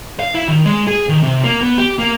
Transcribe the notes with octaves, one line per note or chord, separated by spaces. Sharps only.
F5
E4
D#3
G#3
G#4
D#3
C3
A#3
B3
G4
A#3